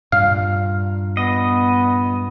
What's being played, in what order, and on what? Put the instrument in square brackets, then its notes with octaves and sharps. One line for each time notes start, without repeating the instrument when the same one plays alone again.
[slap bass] G2 A#2 G3 [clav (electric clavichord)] F5
[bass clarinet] B3 [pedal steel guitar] D#5